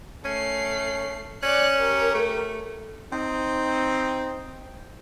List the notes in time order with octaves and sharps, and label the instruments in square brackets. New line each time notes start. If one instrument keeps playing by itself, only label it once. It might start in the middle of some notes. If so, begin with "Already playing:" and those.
[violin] A3 C7 [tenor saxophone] C#4
[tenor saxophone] C#4 [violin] D5 F#6
[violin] G4 A#4
[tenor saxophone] A3
[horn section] C4 D#4